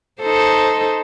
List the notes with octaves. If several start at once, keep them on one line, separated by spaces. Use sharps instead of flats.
D#4 A4 C5